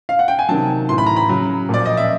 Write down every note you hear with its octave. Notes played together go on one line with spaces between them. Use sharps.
F5
F#5
G5
G#5
C3 D#3 F#3 A5
A2 E3 C6
B5
A#5
B5
C#3 F#3
A#2 F3 D5
D#5
E5